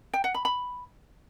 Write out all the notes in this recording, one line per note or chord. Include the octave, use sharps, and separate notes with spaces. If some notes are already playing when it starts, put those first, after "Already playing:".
G5
F#5
B5
B5